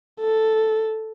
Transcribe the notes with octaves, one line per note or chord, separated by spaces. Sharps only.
A4